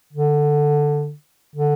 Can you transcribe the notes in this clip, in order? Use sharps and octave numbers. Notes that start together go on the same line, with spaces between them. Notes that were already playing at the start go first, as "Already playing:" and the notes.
D3
D3